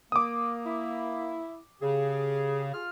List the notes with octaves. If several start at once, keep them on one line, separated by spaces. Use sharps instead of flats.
A#3 D6 D#6
E4
C#3 G4 G#4
F4 F6